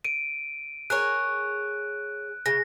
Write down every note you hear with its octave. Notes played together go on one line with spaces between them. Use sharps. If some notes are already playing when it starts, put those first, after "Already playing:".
D7 D#7
G#4 A#4 C#5 F#6
C#3 A#6